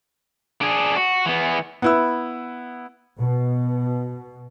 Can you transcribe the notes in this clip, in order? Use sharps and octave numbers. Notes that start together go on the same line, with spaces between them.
D4 G#4
F#4
E3 B3
B3 E4 E6
B2